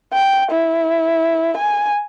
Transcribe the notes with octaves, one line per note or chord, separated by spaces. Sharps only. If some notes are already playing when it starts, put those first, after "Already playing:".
G5
E4
G#5